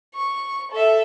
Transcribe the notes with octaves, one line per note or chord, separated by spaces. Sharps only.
C#6
A4 E5